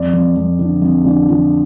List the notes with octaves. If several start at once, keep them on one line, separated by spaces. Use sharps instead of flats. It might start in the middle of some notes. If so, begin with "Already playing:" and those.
Already playing: F2 D5
F2
F2
D3
F2
D3
F3